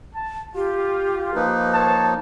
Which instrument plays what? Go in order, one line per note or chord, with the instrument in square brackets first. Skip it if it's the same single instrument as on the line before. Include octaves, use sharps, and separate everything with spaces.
[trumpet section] A5
[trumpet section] F4 [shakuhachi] G4
[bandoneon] F3 A#3 D#4 [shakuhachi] B4
[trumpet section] C5 C#5 A5